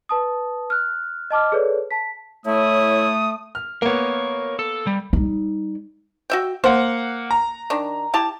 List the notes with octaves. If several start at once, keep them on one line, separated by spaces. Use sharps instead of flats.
B4 A5 D#6
F6 F#6
D#5 A5 D6 F6
G#4 A4 B4 C#5 D5
A5 B6
A2 A3 E4 C#5 D#6
F6
A#3 B3 A#4 C#5
A4
G3
G3 D#4
F#4 E5 G5
A#3 C5 F#5
A#5
D#3 D4
E4 G4 A5